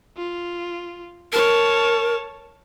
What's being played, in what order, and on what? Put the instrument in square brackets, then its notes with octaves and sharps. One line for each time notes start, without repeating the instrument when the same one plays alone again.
[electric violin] F4
[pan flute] A#4 [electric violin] C#5 A5